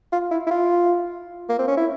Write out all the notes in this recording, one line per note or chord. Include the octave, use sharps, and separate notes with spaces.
F4
E4
E4
F4
A#3
C4
C#4
E4